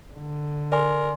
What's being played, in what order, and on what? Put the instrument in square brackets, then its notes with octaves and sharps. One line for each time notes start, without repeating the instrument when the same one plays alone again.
[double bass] D3
[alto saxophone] A#4 [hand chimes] D5 G#5 C6